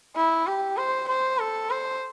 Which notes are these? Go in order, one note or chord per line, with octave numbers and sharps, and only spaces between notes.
E4
G4
C5
C5
A4
C5